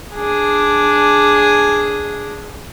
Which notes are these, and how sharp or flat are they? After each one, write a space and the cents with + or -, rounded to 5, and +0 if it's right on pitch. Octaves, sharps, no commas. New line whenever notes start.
D4 +0 G#4 +0